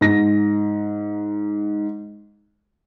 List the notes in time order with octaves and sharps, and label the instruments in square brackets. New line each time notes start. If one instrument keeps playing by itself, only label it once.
[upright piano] G#2 A#6